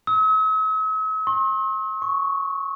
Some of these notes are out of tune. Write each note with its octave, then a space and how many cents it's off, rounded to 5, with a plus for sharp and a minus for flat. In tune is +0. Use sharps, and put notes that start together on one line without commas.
E6 -45
C6 +40
C#6 +5